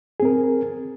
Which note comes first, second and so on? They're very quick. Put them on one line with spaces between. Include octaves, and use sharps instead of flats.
G#4 C4 A#4